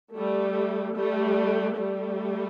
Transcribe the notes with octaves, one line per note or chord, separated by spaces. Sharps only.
G3 A3
G3 A3
G3 A3